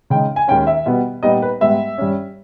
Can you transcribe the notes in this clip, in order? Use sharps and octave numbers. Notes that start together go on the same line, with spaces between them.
C#3 G#3 D#4 G5
G#5
D#2 D#3 G#3 C#4 G5
E5
B2 G3 B3
A#2 G3 B3 D#4 D#5
B4
G#2 G3 B3 E5
G2 G3 C#4